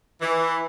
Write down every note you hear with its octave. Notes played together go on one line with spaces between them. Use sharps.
E3